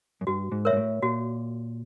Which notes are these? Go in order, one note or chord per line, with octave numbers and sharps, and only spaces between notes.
F#2
G2 F#4
G#2
A#4 C#5 E5
G#2
A2
A#2 F#4